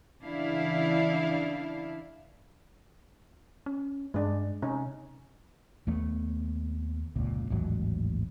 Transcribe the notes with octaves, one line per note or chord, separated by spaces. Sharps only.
C#3 E3 D4 E4 F5
C#4
G2 G#3 D4
C3 C#4 D#4
D#2 A3 B3
F1 C#2 A#2
A1 D#2 G#2 F#3